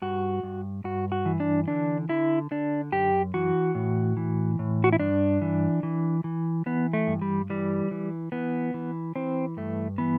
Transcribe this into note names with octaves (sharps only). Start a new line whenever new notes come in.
G2 F#4
G2
G2 F#4
F#4
E3
D4
D3 D4
D3 E4
D3 D4
F#2 G4
E3 F#4
A2
E3
A2
F#4
E4
G2 D4
E3
E3
E3
E3 B3
A3
G2
G3
E3 G3
E3
E3 B3
E3
E3 C4
G2 A3
E3 B3